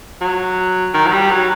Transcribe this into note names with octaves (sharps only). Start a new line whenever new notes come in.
F#3
D#3
F#3
G3
F#3